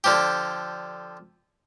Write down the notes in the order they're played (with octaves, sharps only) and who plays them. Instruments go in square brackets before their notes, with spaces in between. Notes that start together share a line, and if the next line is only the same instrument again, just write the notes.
[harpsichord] D3 F3 G4